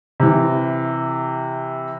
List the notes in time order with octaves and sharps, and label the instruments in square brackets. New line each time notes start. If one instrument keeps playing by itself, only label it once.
[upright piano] C3 E3